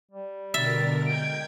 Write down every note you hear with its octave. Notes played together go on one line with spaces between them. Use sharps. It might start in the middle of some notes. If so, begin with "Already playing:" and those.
G3
B2 D3 A#4 E5 A6
G#3 G5 G6 G#6 D7